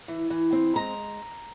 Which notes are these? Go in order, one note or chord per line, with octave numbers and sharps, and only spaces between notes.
E3
E3
C4
G#3 A#5